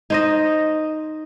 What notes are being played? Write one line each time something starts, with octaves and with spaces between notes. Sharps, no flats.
D#4 C5 D#5